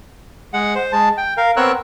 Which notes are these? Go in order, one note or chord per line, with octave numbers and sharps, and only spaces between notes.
G#3 F#5
C5
G#3 A5
G5
A#4 F5
B3 C4 A#4 C#5 E6 F#6